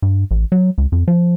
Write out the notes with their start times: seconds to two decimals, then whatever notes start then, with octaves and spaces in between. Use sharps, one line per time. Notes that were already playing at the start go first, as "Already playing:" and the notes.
0.02 G2
0.31 A1
0.52 F#3
0.78 C#2
0.92 F2
1.08 F3